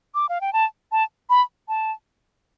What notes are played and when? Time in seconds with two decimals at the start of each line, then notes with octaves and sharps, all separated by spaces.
0.15 D6
0.29 F5
0.41 G5
0.53 A5
0.92 A5
1.30 B5
1.68 A5